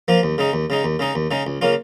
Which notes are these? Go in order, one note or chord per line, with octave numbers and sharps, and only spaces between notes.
F3 A#3 F4
D#2
C#3 G#3 D#4
D#2
C#3 G#3 D#4
D#2
C#3 G#3 D#4
D#2
C#3 G#3 D#4
C#2
C#3 A#3 C#4 F4